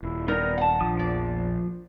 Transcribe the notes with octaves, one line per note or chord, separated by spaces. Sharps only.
D#1 E4
G3 B3 D#4 A#4 A#5
F#5 A5
A#1 F3 D4 D#6
E2 D5